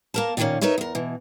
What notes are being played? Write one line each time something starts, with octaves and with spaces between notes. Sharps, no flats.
A#3 A#4 A5
A#2 D#3 F3 G#3 A#3 C#4
D#4 A#4 B4 C#5 E5
E2 A#4
B2 E3